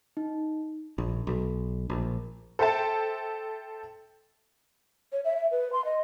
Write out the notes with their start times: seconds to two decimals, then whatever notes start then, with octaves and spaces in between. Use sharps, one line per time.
0.17 D#4
0.98 A#1
1.27 B1
1.90 A#1
2.59 A4 C5 E5 G5 A5
5.12 C#5
5.25 E5
5.37 E5
5.51 B4
5.73 C6
5.85 D#5